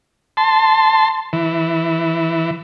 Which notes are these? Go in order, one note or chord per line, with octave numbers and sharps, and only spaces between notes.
A5 C6
E3